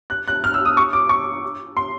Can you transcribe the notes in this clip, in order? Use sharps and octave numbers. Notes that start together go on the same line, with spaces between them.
F#6
F#6
F6
E6
D#6
C#6
D6
C#6
C6